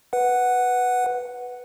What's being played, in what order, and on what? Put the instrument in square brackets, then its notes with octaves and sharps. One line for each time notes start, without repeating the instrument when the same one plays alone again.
[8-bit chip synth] B4 F#5